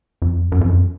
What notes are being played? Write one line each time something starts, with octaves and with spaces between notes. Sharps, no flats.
F2
F#2
F2
F#2